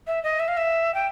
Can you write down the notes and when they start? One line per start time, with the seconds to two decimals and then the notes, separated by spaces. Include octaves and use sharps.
0.07 E5
0.23 D#5
0.40 E5
0.48 F5
0.57 E5
0.94 G5